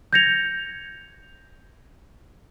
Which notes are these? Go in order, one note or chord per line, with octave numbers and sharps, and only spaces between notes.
G6 G#6 A#6 C#7 F7